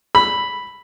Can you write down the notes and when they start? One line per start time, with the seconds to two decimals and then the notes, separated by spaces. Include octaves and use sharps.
0.15 B5